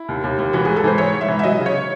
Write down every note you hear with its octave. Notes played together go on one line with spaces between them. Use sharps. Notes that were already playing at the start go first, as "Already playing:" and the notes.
Already playing: E4
D#2
D#2
D#2
E3 F#4
G#2 G#4
A4
E3 C5
G#2 C#5
G#2
E5
E3
E5
F#3 D#5
C#3
C#5